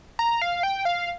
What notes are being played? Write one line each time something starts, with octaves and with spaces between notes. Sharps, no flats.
A#5
F5
G5
F5